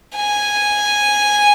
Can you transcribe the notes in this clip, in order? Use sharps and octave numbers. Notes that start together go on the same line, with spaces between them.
G#5